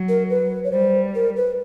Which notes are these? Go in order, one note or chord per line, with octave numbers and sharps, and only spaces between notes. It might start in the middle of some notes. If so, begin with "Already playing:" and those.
Already playing: F#3
A#4
B4
C#5
G3 C5
A#4
B4